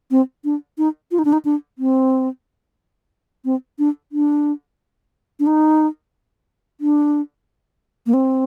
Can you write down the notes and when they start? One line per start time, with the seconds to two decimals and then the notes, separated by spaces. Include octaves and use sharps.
0.11 C4
0.44 D4
0.78 D#4
1.11 F4
1.19 D#4
1.25 D4
1.33 D#4
1.45 D4
1.78 C4
3.45 C4
3.79 D4
4.12 D4
5.40 D4
5.47 D#4
6.81 D4
8.06 A#3
8.14 C4